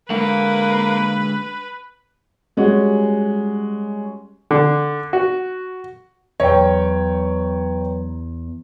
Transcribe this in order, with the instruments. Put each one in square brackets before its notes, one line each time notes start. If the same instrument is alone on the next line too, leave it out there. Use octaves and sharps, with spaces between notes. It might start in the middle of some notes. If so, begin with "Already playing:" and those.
[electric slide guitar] D3 G#3 F#5 [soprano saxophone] A#3 [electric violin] B4
[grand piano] G3 G#3 C#4 F#4
[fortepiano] D3
F#4
[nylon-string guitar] E2 [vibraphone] F#3 B4 A#5 [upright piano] C#5 G5